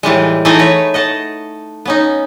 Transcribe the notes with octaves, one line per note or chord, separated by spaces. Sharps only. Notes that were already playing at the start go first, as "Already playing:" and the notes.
A2 E3 G3 G#3
E3 A3 D#4 G#4 G#5 A#5
F#4 B4 C#5
D#5 F#5 A5
B3 C#4 D#4